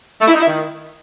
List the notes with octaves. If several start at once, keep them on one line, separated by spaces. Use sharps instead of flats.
A3
E4
D#4
E4
D#3